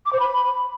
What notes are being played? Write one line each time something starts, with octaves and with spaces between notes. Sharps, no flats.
D6
C5
B5